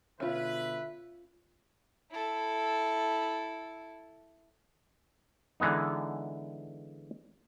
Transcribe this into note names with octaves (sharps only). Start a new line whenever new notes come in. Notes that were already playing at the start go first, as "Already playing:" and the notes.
B2 D3 C#4 F4 B4 E5
E4 A4
D3 E3 G#3 B3 D#4